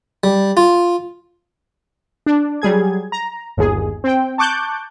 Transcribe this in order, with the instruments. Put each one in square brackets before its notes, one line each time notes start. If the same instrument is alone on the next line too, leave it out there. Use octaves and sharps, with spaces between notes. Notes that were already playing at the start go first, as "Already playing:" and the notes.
[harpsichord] G3
F4
[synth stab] D4
F#3 G3 G#4 G#6
A#5
G1 D#2 G#4
C4 G5
A5 C#6 D6 F#6 G6